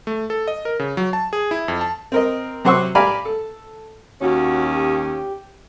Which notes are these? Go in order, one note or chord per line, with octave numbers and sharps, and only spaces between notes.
A3
A4
D#5
A#4
C#3
F#3
A5
G#4
E4
F2
A5
C4 A#4 D#5
C3 F#3 C5 F#5 C#6 E6
G4 D5 F5 G#5 A#5 B5
A4
D#2 C#4 F#4
G4